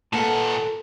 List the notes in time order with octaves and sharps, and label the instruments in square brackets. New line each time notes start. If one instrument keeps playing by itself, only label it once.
[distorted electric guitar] A#2 F#5 [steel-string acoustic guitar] A#3 B4 G#5 [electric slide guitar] A4 A5